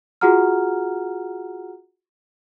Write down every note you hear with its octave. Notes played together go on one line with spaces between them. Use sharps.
F4 F#4 G#4 F#5 A#5 F6